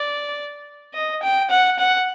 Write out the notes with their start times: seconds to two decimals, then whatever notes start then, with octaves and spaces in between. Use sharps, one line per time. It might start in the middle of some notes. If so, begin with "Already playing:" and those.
Already playing: D5
0.94 D#5
1.23 G5
1.50 F#5
1.79 F#5